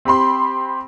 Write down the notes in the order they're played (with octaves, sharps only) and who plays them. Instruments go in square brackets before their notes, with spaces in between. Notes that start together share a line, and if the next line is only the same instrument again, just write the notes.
[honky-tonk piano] C4 G4 B5 C6